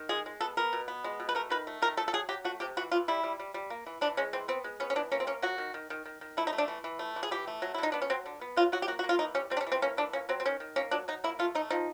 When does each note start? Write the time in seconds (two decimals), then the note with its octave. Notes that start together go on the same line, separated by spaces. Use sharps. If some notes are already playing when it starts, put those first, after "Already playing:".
Already playing: D#3
0.09 G#3 G#4
0.26 G#3
0.41 B3 A4
0.57 B3 A#4
0.73 B2
0.88 B3
1.04 G#3
1.20 B2
1.29 B4
1.35 A3 A#4
1.50 D#3 B4
1.67 A3
1.82 D#3 A#4
1.97 A3 A4
2.08 A4
2.13 F#3 G#4
2.29 F#3 G4
2.44 A3 F#4
2.60 C3 G4
2.77 E3 F#4
2.91 E3 F4
3.08 G3 E4
3.23 G3
3.39 G3
3.54 G3
3.70 A#3
3.86 E3
4.01 E3 D4
4.17 G#3 C#4
4.33 E3 C4
4.48 B3 C4
4.64 G#3
4.80 B3 C#4
4.90 C#4
4.96 E3 D4
5.12 A#3 C#4
5.20 C4
5.27 A#3 C#4
5.42 F#3 F#4
5.58 D#3
5.74 D#3
5.90 D#3
6.05 D#3
6.21 D#3
6.37 A3 E4
6.47 D#4
6.53 A3
6.58 D4
6.68 E3
6.84 E3
6.99 A3
7.16 E3
7.23 G#4
7.31 E3 G4
7.47 A3
7.62 F#3
7.74 E4
7.78 D3 D#4
7.92 B3 D4
8.02 C#4
8.10 F#3 C4
8.26 D3
8.41 B3
8.56 F#3 F4
8.72 F#3 F#4
8.82 G4
8.88 A#3 F#4
8.99 F#4
9.04 A#3
9.09 F4
9.19 E3 D#4
9.34 G3 C#4
9.50 G3 C4
9.57 D4
9.61 C#4
9.67 E3
9.72 C4
9.82 A#3 C#4
9.97 E3 D4
10.13 A#3 C#4
10.29 F#3 C4
10.40 C4
10.45 D#3 C#4
10.60 D#3
10.76 A#3 C#4
10.91 F#3 D4
11.08 F#3 D#4
11.24 A#3 E4
11.39 A3 F4
11.55 A3 D#4
11.70 F3 D#4